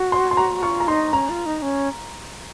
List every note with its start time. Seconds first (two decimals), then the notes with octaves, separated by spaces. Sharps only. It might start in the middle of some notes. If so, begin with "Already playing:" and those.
Already playing: F#4
0.12 C6
0.31 C6
0.37 A#5
0.62 F4 C#6
0.80 A#5
0.88 D#4 C6
1.13 C#4 A#5
1.30 F4
1.46 D#4
1.62 C#4